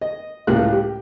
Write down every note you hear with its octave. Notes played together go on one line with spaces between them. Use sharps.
D#5
C#2 A2 A#3 G4 F5 F#6
G4